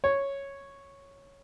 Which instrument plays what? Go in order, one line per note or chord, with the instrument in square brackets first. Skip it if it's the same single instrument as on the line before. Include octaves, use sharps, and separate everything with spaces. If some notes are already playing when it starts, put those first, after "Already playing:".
[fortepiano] C#5